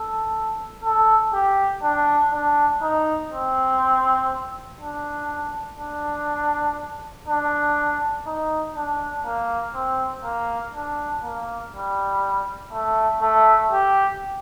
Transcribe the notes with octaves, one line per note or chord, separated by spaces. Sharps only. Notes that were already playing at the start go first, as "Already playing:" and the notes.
Already playing: A4
A4
G4
D4
D4
D#4
C4
D4
D4
D4
D#4
D4
A#3
C4
A#3
D4
A#3
G3
A3
A3
G4